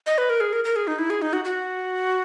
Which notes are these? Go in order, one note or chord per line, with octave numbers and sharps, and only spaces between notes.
D#5
B4
A#4
G#4
A#4
A#4
G#4
D#4
E4
G#4
D#4
F#4
F#4